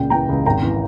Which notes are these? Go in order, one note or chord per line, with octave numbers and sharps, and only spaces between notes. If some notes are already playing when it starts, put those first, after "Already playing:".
Already playing: C#2 A#2 C#3 G5
E3 G5 A#5
C#2
G#1 G5 A#5
E3